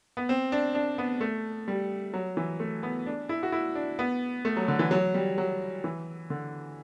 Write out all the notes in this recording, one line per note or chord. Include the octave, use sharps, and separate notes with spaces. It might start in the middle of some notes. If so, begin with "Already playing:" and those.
B3
C4
D4
D4
B3
A3
G3
F#3
E3
A3
B3
D4
E4
F#4
E4
D4
B3
A3
F#3
D3
E3
F#3
G3
F#3
E3
D3